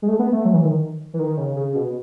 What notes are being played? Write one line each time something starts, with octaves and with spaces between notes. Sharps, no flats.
G#3
A3
B3
A3
F#3
E3
D#3
E3
D#3
C#3
C#3
B2